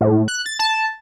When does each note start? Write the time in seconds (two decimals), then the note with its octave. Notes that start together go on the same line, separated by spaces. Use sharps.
0.01 A2
0.28 F#6
0.46 A6
0.59 A5